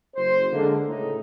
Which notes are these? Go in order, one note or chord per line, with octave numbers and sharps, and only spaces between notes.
F#1 C5
D3 G#3 A#3
C#2 A2 D#4